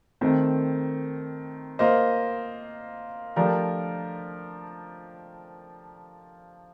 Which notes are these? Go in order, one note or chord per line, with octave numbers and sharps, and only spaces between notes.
D#3 A3 C4
A#3 F4 C5 D#5
F3 A3 D4 G4 A#4